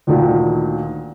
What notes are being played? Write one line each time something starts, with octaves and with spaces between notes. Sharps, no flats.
D2 A#2 D#3